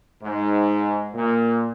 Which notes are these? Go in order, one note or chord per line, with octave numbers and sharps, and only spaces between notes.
G#2
A#2